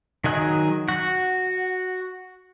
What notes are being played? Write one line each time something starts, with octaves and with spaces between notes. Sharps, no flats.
D#3 F#3 G#4 D#5 F#6
F#4 F#5